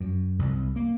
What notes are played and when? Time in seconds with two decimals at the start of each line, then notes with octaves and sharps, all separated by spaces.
0.01 F#2
0.39 C2
0.76 A#3